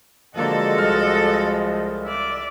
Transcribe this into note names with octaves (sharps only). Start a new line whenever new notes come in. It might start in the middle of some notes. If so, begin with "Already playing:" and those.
D3 F3 G#3 A#3 F#4 A4 D#5
C2 F6
D5 E5